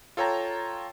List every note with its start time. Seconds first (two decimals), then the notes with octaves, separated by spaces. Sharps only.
0.17 F4 A4 C#5 G5 A#5